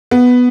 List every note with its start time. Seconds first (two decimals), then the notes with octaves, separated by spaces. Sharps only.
0.11 B3